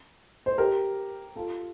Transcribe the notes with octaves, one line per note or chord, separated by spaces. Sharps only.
C5
G4 A#4
F4 A4